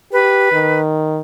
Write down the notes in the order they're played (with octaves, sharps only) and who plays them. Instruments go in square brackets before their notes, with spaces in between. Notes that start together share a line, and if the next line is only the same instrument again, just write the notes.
[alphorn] G4 [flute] B4
[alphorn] D#3